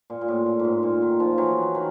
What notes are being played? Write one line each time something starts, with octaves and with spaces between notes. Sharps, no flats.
A#2
A#2
A2
A#2
G#2
A2
A#2
D#3
F3
E3 F#3
D#3